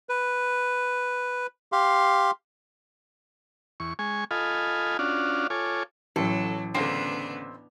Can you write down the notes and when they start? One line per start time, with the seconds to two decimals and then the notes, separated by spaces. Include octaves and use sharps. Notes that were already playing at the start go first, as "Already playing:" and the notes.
0.09 B4
1.72 G4 F5 C6
3.80 E2 C#6
3.99 G#3 G#5 C#6
4.31 F4 A4 D#5 F5 G#5 B5
4.99 C#4 D4 F4 F#4 D5 F5
5.50 F4 A4 C#5 G#5 D6
6.16 A1 F#3 A4
6.75 D2 C#3 B3 C4 D4 A4